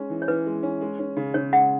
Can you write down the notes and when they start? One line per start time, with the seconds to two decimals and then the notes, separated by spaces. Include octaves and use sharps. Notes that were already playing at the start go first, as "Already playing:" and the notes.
Already playing: G#3 C#4
0.10 E3
0.22 C#5
0.28 E3 B4
0.46 G#3
0.63 C#4
0.81 G#3
0.99 C#4
1.17 C#3
1.34 C#3 C#5
1.52 G#3 F#5